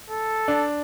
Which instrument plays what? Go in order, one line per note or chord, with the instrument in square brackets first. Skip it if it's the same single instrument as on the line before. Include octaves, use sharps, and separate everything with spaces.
[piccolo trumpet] A4
[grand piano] D4